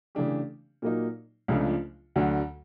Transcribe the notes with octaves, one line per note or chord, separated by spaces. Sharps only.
C#3 E3 A3 D4 G4
A#2 F#3 A#3 D#4
C#2 C#3 F3 A3 D4
D2 D3 F#3